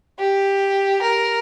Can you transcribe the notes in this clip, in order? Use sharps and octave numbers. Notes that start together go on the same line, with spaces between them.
G4
A#4